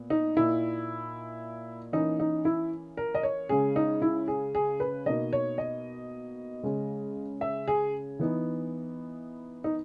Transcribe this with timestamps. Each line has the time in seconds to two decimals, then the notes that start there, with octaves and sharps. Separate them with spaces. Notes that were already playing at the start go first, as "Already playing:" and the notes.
Already playing: A#2 B3
0.10 D#4
0.37 A#2 A#3 D#4 E4
1.93 E3 A#3 C#4 D#4
2.20 D#4
2.45 E4
2.97 A#4
3.15 D#5
3.23 C#5
3.49 C#3 G#3 C#4 G#4
3.76 D#4
4.02 E4
4.28 G#4
4.55 G#4
4.80 B4
5.06 B2 A#3 D#4 D#5
5.33 C#5
5.58 D#5
6.63 C#3 G#3 C#4
7.41 E5
7.68 G#4
8.19 E3 B3 D#4
9.64 D#4